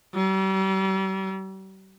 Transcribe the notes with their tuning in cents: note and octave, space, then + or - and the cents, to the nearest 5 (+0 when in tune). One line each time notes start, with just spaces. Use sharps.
G3 -40